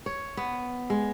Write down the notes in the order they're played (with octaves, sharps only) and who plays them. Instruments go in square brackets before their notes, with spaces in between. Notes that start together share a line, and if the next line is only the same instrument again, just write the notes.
[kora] C#5
B3
G#3